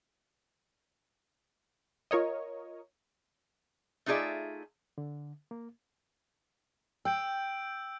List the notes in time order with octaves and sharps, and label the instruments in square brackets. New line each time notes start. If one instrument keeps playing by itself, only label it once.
[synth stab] F4 A#4 C#5 D#5
[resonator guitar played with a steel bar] A3 D#4 F4 G#4 D5 E5
[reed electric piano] D3
A#3
[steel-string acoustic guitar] G5 [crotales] E6 G6 D7